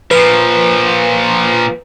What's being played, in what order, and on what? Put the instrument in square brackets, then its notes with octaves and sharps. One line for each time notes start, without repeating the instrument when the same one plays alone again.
[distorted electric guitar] A#2 F3 [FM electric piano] B4